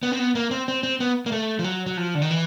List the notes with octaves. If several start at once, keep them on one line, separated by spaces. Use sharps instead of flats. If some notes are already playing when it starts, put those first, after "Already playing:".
B3
C4
B3
A#3
C4
C4
C4
B3
A#3
A3
F3
F#3
F#3
F3
D3
D#3
E3